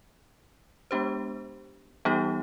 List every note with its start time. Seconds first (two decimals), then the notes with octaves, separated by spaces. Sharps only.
0.91 G#3 B3 D4 G4 C5
2.05 E3 G3 B3 D#4 G4